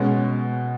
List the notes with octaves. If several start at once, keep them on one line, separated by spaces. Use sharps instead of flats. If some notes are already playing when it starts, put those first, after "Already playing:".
Already playing: B2 G#3 C#4